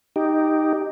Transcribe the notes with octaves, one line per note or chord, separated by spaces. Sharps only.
D#4 G4